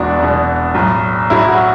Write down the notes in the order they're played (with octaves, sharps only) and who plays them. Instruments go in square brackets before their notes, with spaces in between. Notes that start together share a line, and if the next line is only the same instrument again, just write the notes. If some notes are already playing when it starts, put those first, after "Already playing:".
Already playing: [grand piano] E1 E2 B2 D4 F#4
E1 E2 B2
B1 A2 F#3
B1 A2 F#3 E4
F#4